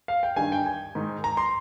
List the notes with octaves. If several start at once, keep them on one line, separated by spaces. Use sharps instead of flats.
F5
G5
G2 D#3 G#5
G5
G#5
G#2 D#3
A#5
C6